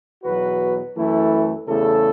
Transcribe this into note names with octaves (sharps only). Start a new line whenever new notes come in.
E2 B2 F#3 F#4 B4
F#2 E3 A3 E4 A4
E2 C#3 A3 E4 A4